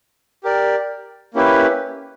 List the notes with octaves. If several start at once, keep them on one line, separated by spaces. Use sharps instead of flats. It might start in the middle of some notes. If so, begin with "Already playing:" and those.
G4 A#4 D5
A#3 C#4 E4 G4 B4